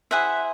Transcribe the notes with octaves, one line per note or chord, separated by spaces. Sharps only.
E4 G#4 C5 E5 F#5